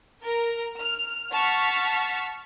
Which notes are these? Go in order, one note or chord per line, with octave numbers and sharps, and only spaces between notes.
A#4
F6
F#5 A5 C#6 F6 B6